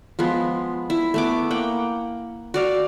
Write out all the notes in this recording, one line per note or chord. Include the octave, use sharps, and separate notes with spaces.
F3 G#3 B3
E4
A3 B3 D6
A#3 F#5 G5
F#4 D5 F5